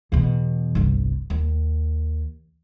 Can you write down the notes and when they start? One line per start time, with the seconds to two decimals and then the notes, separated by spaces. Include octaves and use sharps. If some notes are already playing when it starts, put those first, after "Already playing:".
0.12 E2 B2
0.75 G1 C2
1.30 D#2